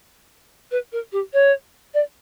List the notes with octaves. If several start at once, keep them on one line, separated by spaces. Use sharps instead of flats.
B4
A#4
G4
C#5
D5